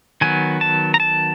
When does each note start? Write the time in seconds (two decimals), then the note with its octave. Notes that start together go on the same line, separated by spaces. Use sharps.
0.21 D#3 F#3 B3 G#5
0.61 A5
0.94 A#5
1.00 A5